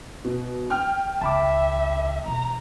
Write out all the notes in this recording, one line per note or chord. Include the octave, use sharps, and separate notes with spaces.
B2
G5 F6
C#2 E5 A5 B5 D6
E2 B2 A#5